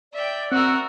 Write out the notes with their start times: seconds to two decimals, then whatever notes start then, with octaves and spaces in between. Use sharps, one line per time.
0.13 D5 E5 G5
0.52 C4 F#4 A#4 F#5 E6